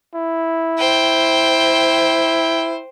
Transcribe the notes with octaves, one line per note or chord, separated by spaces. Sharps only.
E4
C5 G5